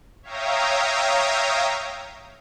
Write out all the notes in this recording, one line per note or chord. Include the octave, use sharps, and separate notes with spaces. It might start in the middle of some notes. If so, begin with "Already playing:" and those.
C#5 E5 F5 G5 A#5 D#6